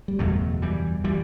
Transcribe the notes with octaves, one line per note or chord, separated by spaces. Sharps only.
G3
F#1 E2 B2 F#3 A3
E3 G3
E3 G3